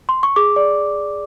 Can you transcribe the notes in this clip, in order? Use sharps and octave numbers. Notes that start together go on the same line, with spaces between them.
C6
C#6
G#4 D6
D5